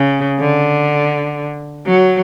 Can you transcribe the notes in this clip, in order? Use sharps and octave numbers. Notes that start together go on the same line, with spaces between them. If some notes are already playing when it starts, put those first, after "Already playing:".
Already playing: C#3
D3
F#3